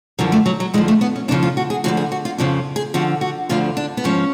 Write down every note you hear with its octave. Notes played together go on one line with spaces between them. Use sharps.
F#2 D3 F3 F#3
A3
F#3
F#3
F2 D3 F3 G#3
A3
B3
C#4
F2 C#3 F3 D4
F4
F#4
G#4
D2 D3 F3 F#4
G#4
F#4
F4
F2 C#3 F3 D4
G#4
F2 D3 F3 F#4
F#4
D2 D3 F3 F4
D4
B3
G#2 F3 C#4